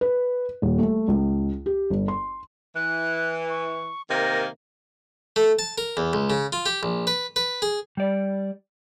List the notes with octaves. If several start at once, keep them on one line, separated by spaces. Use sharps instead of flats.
B4
D#1
A3
C#2
G4
G1
C6
E3 F#6
C#6
C3 D#3 A#3 A#6
A3
A5
A#4
E2
C#2
C#3
F4
G4
A#1
B4
B4
G#4
G3 D5